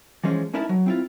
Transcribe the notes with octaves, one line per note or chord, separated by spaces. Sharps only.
E3 F3 G#3 C#4
C#4 D#4 E4 A#4 E5 A5
F#3
C4 E4 F4